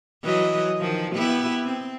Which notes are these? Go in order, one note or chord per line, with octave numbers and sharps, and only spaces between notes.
E3 F#3 D#5
D#3 F3
B3 E4 G4
C4